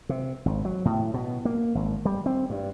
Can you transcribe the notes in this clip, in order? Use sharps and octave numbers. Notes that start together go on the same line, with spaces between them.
C3
G#1
F#3
A2
B2
A#3
G#1
G3
C4
G2